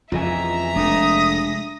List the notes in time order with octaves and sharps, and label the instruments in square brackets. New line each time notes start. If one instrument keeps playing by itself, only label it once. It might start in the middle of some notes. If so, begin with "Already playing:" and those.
[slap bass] F2 C#3 E3 [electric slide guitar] F4 D#5 G#5 [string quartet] E5 A#5
[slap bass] F1 A3 [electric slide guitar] G#3 D4 [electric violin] D#6 A#6